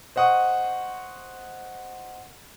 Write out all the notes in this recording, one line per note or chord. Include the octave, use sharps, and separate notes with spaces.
C5 D#5 F#5 C#6 D#6